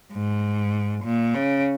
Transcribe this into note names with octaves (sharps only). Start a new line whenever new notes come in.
G#2
A#2
C#3